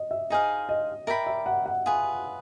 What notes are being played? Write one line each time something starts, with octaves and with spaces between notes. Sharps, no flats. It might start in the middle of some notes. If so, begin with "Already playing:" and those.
Already playing: D#5
E5
D#4 G#4 C5 D#5 F5
D#5
A#4 D5 E5 G5 B5
E5
F#5
F#5
F4 G#4 B4